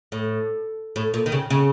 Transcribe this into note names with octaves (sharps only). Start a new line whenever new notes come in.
A2
A2
A#2
D#3
C#3
C#3